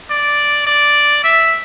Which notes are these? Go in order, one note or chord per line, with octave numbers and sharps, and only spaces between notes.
D5
D5
E5